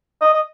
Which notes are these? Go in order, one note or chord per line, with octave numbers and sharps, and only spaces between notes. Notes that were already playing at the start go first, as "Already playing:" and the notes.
D#5
D#5